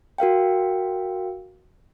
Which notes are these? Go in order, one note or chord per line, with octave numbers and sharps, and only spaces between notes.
F#4 A#4 F5 G5